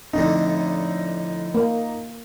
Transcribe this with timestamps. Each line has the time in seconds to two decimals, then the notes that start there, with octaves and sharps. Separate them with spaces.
0.13 F2 A2 D3 D#4
1.54 A#3